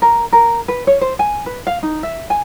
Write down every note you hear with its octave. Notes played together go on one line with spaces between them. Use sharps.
A#4
A#4
B4
C#5
C5
G#5
B4
F5
D#4
E5
G#5